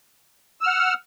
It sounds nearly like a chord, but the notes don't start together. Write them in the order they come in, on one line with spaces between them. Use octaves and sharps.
E6 F6 F#5